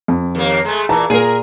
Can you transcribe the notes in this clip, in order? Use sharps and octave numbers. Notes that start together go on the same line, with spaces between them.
F2
D#2 A#3
G#3 A3
A#2 E3 A5 A#5
A#2 G#4 A#4 D#7